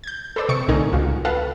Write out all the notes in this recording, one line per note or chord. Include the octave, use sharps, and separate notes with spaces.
G6 G#6
A4 B4 C5 D5 E6
C3 C#6 D6 C#7
C2 A2 D3 D#4 A#4 G#5
C#2 F4 F#4
A4 B4 F5 F#5